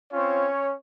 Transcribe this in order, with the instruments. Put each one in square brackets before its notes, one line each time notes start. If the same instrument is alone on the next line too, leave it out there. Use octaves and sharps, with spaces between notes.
[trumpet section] C4 C#4 F4 C#5